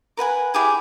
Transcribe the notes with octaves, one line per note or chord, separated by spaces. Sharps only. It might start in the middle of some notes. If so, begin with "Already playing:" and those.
A#4 B4 F#5 G#5
E4 G4 G#4 G#5